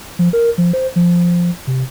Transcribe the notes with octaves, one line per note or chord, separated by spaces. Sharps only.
F3
A#4
F3
C5
F3
C3